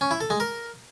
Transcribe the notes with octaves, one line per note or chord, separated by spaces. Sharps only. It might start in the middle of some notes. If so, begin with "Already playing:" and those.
C#4
E4
A4
G#3
A#4